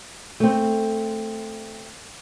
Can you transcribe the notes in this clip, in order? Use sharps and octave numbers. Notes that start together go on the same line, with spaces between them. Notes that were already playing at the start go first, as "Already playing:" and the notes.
A3 C4